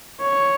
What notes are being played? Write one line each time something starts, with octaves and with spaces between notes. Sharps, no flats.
C#5